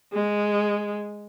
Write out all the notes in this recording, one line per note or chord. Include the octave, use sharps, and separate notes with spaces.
G#3